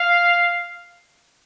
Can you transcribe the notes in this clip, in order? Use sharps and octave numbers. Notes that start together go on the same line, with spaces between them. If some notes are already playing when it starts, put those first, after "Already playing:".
Already playing: F5